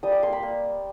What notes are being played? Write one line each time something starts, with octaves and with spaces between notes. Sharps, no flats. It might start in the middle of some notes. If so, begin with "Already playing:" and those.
G3 D#6
D6
A#3 C6
B5
A#3